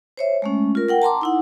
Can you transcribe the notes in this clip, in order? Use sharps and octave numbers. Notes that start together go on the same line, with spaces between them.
C5 C#5 E5
G#3 A3 C#4
F4 A#4
A#4 F#5 G5
A5 A#5 C6 D6
D#4 E4 F#5